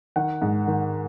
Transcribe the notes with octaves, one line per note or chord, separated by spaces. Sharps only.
D#3 F#5
G#2
D#3